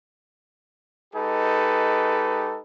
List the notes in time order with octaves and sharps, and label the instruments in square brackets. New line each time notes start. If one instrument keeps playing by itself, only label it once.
[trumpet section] G#3 D#4 G4 A4 B4